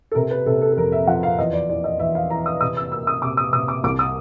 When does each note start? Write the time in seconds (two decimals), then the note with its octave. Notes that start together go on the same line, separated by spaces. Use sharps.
0.11 A4
0.15 C3 A#4
0.31 B4
0.46 C3 A4
0.62 A4
0.72 A4
0.77 F2 A#4
0.92 E5
1.07 F3 F#5
1.23 F5
1.38 E2 D#5
1.53 D5
1.69 E3 D5
1.84 D#5
1.99 E2 E5
2.15 F5
2.30 E3 A#5
2.46 D#6
2.61 C3 D#6
2.77 E6
2.92 A#3 E6
3.07 D#6
3.22 C3 D6
3.37 D#6
3.53 C3 D#6
3.68 D6
3.84 C2 D6
3.99 D#6